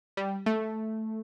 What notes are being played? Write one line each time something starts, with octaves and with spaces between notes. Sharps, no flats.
G3
A3